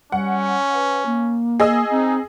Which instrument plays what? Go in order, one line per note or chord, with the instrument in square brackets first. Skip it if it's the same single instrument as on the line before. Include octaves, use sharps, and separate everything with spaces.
[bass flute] G3 [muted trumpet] C#4 [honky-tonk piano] F#5
[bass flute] B4
A#3
[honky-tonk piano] G#4 D#5 E6
[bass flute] C4 [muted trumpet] D#4